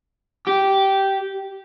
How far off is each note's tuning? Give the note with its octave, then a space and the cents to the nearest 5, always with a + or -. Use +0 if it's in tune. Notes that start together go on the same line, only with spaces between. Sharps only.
G4 -10